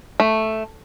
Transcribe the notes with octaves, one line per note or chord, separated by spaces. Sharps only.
A3